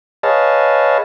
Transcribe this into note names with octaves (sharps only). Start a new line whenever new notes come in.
G#4 B4 C#5 D#5 F5 A5